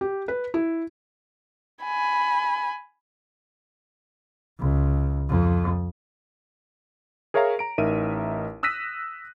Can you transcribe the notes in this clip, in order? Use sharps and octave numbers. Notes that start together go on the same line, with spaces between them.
G4
B4
E4
G#5 B5
C#2
F2
G#4 A#4 C#5 E5 F5 A#5
A#5 D7
A1 D#4 A#4 E5 D#7
D#6 E6 F#6 A#6 B6 D#7